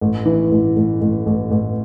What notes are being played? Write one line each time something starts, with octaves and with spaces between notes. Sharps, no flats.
A1
E3
A1
A1
A1
A1
A1